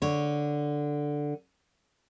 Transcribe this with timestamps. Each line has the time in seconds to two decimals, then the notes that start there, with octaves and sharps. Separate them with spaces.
0.02 D3 C#5